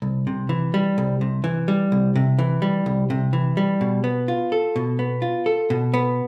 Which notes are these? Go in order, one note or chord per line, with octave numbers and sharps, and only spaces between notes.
C2
C3
E3
G3
C2
C3
E3
G3
C2
C3
E3
G3
C2
C3
E3
G3
B2
B3
F4
A4
B2
B3
F4
A4
B2
B3